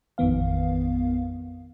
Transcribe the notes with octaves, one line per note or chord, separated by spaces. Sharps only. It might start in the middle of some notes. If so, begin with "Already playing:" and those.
A1 F2 D#3 B3 F5